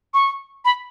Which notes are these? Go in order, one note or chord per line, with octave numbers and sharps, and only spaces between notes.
C#6
B5